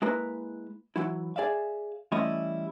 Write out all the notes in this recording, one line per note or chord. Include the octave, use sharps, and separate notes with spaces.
G#3 A#3 E4 B4 A#5
E3 F#3 E4
G#4 D5 E5 F5
E3 G3 A3 C#4 E4 D#5